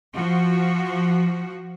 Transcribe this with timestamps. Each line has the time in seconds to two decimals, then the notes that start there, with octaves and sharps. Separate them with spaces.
0.14 F3 F#4